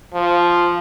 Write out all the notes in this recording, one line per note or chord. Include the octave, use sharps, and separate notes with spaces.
F3